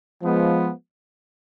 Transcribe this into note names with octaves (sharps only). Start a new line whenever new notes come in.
F3 G#3 B3